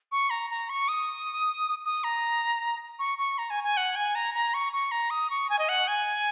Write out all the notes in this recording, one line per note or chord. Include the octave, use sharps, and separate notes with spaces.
C#6
A#5
A#5
C#6
D#6
D#6
A#5
C#6
C#6
A#5
G#5
G#5
F#5
G#5
A#5
A#5
C#6
C#6
A#5
D#6
C#6
G#5
D#5
F#5
G#5